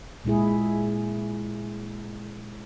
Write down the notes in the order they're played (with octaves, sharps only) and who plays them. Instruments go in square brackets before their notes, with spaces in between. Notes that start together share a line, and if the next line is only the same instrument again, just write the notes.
[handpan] A#2 G#3 E4 G#4